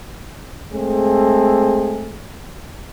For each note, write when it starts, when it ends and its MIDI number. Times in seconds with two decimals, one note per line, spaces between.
0.73 2.18 56
0.73 2.18 57
0.73 2.18 60
0.73 2.18 68